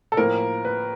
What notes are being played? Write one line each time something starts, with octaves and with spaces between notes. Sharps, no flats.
A4
A2 F3 A#3 A#4
B4